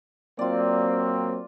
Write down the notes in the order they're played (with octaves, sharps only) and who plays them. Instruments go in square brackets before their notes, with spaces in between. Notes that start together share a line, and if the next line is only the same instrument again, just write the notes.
[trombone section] F#3 A#3 C4 [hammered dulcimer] F4 D5